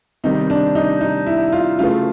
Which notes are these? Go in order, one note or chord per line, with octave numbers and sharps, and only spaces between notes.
C3 D#3 G3 D#4
D4
D#4
D#4
E4
F4
C#3 F#3 A3 F4